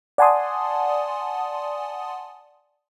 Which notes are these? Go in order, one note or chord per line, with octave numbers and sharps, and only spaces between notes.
D5 F#5 G#5 A5 C6 D#6